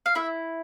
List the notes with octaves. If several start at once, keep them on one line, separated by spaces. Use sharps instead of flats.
F5
E4 E5